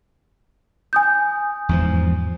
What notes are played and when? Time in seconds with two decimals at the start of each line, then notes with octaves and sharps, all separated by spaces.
0.93 G#5 D#6 G6
1.69 E2 G#2 F3